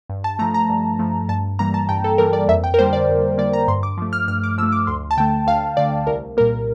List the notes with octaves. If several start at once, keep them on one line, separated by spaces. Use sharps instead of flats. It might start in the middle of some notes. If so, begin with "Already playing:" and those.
G2
A5
F3 A3 A#5
A#5
G2
F3 A3
G2 A5
E3 G3 A#3 A#5
A5
G2 G5
A4
E3 G3 A#3 A#4
D5
F2 E5
G5
A#4
D3 G3 A#3 C5
D5
F2
D3 G3 A#3 D5
A#5
G2 C6
D6
F3 A3
F6
G2 F6
D6
F3 A3 E6
D6
D2 C6
A5
D3 A3 G5
D2 F5
D3 A3 D5
C2 A#4
A#2 G3 A#3 A#4